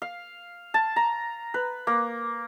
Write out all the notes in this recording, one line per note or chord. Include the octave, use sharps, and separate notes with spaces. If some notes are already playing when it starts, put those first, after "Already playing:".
F5
A5
A#5
B4
A#3